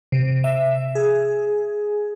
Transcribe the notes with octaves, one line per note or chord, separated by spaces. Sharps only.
C3
E5
G#4